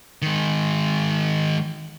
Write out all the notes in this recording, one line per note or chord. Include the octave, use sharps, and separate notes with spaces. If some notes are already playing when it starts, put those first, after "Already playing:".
D#3 G#3